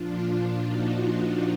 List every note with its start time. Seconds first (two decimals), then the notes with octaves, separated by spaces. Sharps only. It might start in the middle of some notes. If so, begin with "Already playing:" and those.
Already playing: A#2 F3 D4 F4
0.25 D4 F4
0.62 D#4 F#4
0.99 D#4 F#4